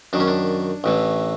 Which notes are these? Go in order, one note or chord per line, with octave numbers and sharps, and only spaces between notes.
F#2 D#3 D4
C#4
D4
A1 A2 E3